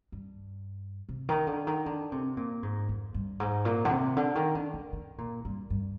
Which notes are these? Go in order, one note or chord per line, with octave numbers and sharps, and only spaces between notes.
G2
C3
D#3
D3
D#3
D3
C3
A#2
G#2
F2
G2
G#2
A#2
D3
C3
D3
D#3
D3
D3
D3
A#2
G2
G2